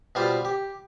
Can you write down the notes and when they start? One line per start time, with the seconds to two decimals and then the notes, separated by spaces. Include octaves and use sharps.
0.15 B2 G3 F4 C5
0.45 G4